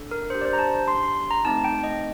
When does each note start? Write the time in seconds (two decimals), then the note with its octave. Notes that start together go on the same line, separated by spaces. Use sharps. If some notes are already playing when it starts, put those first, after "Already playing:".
Already playing: D4 A4
0.11 A#4
0.30 D4 G4 C5
0.41 D5
0.45 C5
0.53 A#5
0.59 A5
0.88 C6
1.03 C6
1.30 A#5
1.45 A3 C4 D#4 A5
1.64 G5
1.83 D#5